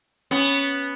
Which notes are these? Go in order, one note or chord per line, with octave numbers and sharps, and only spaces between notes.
B3 C#4